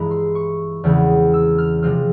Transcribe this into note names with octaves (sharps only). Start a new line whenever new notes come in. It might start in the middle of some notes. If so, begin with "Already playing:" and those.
Already playing: G2 E3 G#3 E4 A#5
C6
C#6
E2 C#3 E3 G#3 C4
E6
F6
C3 F3 G#3 C4 F4 F6